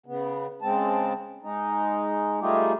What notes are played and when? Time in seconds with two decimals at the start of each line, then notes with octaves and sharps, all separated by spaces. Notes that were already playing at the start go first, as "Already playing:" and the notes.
0.06 C#3 B3
0.62 C#3 G#3 C4 A5
1.43 G#3 D#4
2.41 G3 A3 D#4 F4 G4 G#4